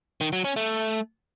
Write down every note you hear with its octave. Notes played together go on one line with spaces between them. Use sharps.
D#3
F#3
C#4
A3